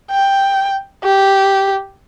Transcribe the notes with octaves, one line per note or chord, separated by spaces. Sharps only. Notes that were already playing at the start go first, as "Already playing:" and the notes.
G5
G4